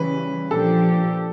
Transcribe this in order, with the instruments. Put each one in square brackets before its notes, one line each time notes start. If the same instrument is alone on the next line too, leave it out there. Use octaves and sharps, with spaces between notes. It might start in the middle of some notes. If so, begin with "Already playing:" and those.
Already playing: [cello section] C#3 E3 G3 [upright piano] B4
[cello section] A#2 F3 A#3 D4 G4 [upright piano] A4